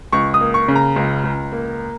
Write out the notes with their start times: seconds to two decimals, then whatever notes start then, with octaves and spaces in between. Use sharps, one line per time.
0.12 C#2 C#6
0.34 D#6
0.41 A#3
0.54 C#6
0.68 C#3
0.75 A#5
0.96 C#2
1.24 C#2
1.52 A#3